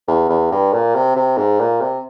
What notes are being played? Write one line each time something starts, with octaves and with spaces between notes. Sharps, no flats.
E2
E2
G2
A#2
C3
C3
G#2
A#2
C3